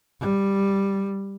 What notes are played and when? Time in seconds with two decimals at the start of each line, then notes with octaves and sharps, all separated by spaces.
0.20 G3